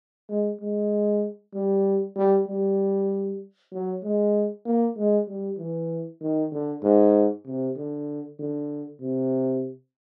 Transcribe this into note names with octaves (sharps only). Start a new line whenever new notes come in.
G#3
G#3
G3
G3
G3
F#3
G#3
A#3
G#3
G3
E3
D#3
D3
G#2
C3
D3
D3
C3